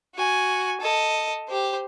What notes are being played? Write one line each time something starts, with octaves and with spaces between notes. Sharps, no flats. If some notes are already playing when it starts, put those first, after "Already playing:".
F#4 G#5
A4 D#5
G4 C5